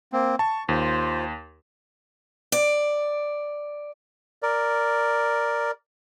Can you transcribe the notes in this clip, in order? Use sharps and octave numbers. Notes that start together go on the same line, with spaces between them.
A#3 C4
A5 C#6
D#2 F4 C5
D5
A#4 D5